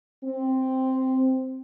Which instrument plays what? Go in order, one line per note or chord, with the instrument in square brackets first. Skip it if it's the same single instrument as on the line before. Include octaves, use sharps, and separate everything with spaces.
[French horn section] C4